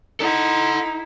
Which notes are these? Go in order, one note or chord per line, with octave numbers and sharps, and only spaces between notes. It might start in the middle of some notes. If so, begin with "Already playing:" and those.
D#4 E4 A4 F#5